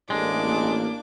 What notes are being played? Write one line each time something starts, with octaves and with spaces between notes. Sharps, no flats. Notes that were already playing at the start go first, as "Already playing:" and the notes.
A1 G#3 A#3 D4 D6